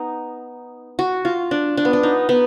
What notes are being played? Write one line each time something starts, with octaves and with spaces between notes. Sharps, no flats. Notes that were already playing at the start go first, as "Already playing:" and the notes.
Already playing: B3 D#4
F#4
F4
D4
D4
B3
D4
D#4
B3